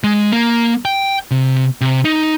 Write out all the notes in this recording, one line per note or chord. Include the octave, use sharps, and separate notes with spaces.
G#3
A#3
G5
C3
C3
D#4